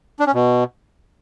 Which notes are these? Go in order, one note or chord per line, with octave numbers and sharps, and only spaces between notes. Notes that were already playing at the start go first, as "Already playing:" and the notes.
D4
C#4
B2